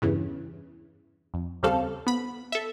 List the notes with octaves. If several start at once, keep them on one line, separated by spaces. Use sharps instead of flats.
E2 G2 C#3 E3
F2
D#2 C#3 G3 C4 A4 F5
B3 B5
A4 E5